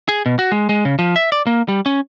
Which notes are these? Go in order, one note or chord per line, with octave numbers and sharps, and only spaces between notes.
G#4
B2
F#4
G#3
G#3
C#3
F3
E5
D5
A#3
G3
C#4